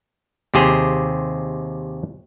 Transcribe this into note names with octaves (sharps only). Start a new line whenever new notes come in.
D#2 C3 G4 G#4 C5